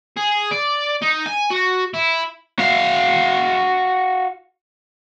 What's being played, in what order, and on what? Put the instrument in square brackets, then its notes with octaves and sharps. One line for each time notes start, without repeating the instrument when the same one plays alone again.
[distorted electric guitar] G#4
D5
D#4
G#5
F#4
E4
[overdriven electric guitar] F#4 F5